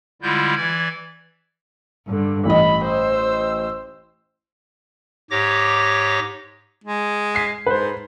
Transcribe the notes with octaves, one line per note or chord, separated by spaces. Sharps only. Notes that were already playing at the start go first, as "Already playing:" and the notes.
D3 G3 G#3 E4 F4 G6
E3 D5 G#6
G2 D3
A1 D#5 B5
C5 E6
G#2 G4 C#5 D6 A#6
G#3
B6 C7
G#2 B4 C5